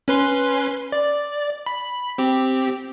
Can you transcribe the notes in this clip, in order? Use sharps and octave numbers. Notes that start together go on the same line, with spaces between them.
C#4 B4 C6
D5
B5
C4 G4